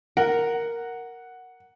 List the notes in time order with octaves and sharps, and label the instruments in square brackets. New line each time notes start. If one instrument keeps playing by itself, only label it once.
[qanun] A#4 [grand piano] F#5